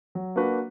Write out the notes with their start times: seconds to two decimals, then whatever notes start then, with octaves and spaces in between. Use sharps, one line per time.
0.15 F#3
0.36 A#3 D4 F#4 B4